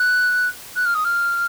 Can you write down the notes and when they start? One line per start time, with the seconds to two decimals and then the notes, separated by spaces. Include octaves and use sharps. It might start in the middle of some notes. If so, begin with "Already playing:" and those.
Already playing: F#6
0.76 F#6
0.85 F6
0.94 D#6
1.04 F6